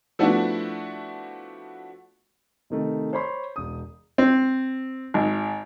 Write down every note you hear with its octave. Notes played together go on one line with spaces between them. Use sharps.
F3 A3 B3 D4 E4 F#4
C3 D#3 A3
C5 C#5 B5 C6
E1 D#6
C4
G#1